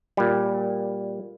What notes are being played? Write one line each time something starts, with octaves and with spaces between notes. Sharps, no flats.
A#2 G3